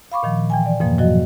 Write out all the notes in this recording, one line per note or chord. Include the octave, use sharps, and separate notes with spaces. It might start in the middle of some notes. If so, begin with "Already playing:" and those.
F5 B5 C#6 D6
A#2 D#3 F3
E3 G5 G#5
D5
F2 G#2 B2 F3 A#3
F3 F#3 F#4 D#5